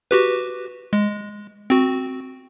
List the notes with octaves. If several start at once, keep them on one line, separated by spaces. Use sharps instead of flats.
F#4 G4 B4
G#3
C4 F#4